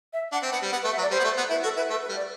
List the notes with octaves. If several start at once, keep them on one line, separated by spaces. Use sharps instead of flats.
E5
D4 F#5
C4
B3 F#5
G3
B3 F#5
B4
A3
E5
F#3
D5
G3 C5
B3
A3
B3
E4 B4
F#4 A4
E4 B4
A3 A4
B4
G3
D5